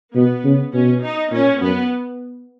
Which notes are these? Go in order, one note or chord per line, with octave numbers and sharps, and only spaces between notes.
B2 B3
C#3
B2 C#4
D#4
A#2 C#4
F#2 B3